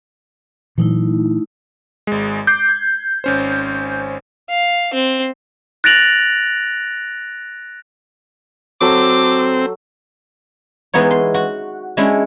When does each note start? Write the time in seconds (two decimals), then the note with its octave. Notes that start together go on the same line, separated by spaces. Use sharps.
0.78 A#2 E3 F#3 A3 D#4 E4
2.07 G#1 G#3
2.47 D6 G6 C7
2.69 G#6
3.24 G#1 C#4 C5
4.50 F5
4.93 C4
5.84 F#6 A6 A#6 D7 F7 F#7
8.81 F#3 C4 A4 D6
10.94 E3 G#3 B3 D#4 C#5
11.11 C6
11.34 F#4
11.97 G#3 C#4 D4 E4